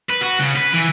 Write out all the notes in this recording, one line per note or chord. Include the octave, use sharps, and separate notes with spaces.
B4
F#4
C#3
B4
E3